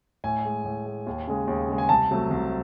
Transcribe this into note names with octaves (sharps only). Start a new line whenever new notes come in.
A2 G#5
G#3
A2
G#3
D#2
C#3 G#3
D#2
C#3 G#3
G#5
C2 A5
C3 F#3 A3
C2